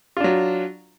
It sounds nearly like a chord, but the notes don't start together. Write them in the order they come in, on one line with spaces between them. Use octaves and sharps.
F4 D4 F#3